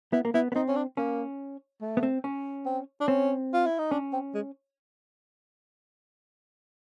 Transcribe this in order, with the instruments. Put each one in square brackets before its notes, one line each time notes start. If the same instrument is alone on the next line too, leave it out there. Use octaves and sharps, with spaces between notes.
[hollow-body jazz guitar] B3 [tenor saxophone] E4
[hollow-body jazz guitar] A#3
[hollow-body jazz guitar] B3 [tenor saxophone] E4
[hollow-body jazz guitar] B3
[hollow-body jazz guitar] C4 [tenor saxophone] D#4
[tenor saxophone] C#4
D4
[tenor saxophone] A#3 [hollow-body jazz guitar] C#4
[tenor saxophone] A3
[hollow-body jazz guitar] B3
C4
C#4
[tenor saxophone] C4
D4
[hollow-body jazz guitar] C4 [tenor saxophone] C#4
[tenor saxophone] F4
E4
D#4
[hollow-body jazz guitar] C#4 [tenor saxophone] D4
[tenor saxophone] C4
G#3